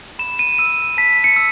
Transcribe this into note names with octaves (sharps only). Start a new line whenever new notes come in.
B5 E7
D#7
E6 D#7
A5 B6
C#7
E6